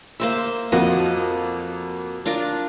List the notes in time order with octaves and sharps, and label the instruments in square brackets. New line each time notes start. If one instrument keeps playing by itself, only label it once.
[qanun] A#3 C5 E5
[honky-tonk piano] F2 A#3 F#4 [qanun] F3 D#5
[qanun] D4 F4 A#4